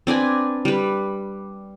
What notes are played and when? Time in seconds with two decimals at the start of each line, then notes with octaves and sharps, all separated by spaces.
0.07 C4 D4 B4 G#5
0.65 G3 B4